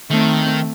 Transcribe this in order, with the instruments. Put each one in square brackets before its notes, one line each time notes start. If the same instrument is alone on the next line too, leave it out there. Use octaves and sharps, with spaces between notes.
[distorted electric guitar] D#3 [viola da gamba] A3 C4